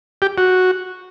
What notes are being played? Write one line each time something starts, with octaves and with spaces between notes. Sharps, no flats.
G4
F#4